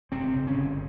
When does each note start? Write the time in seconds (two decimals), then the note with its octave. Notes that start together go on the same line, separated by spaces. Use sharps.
0.12 G1 C3 C4
0.36 C#3
0.47 C#3 C#4
0.58 G1